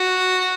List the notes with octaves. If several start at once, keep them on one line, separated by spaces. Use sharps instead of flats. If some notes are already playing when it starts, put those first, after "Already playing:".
Already playing: F#4